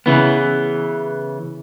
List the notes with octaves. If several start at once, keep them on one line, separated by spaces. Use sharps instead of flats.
C#3 E3 B3